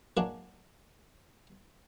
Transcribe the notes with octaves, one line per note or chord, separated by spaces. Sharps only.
F#3 G#3 A#3 D4